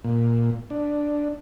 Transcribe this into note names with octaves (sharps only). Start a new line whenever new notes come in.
A#2
D4